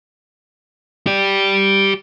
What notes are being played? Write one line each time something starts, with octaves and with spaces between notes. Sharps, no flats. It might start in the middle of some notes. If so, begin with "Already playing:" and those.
G4 D5